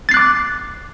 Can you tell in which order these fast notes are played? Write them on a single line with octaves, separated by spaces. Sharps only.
A6 C7 F#6 D6